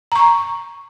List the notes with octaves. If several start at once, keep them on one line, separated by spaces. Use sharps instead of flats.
A#5 C#6